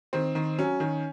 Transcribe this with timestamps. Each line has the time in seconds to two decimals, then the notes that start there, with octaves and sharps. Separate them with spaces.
0.13 D#3 C4
0.35 D#3
0.59 F#3 C#4
0.80 D#3